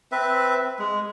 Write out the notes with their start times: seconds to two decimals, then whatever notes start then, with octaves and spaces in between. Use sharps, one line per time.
0.12 C4 B4 E5
0.79 G#3